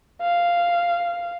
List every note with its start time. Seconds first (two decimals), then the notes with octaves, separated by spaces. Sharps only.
0.22 F5